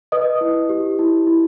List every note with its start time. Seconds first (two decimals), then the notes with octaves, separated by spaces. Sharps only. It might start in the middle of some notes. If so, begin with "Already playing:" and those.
0.12 B4 D#5 D#6
0.41 E4
0.69 G4
0.99 E4
1.27 E4